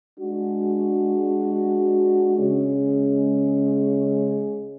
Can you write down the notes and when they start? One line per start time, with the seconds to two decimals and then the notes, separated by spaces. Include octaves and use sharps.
0.19 G#3 D4 F#4
2.37 C#3 G#3 C#4 G#4